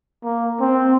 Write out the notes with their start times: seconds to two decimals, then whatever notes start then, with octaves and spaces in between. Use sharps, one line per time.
0.24 A#3
0.60 C4